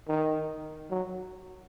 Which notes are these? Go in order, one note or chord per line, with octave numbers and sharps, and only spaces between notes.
D#3
F#3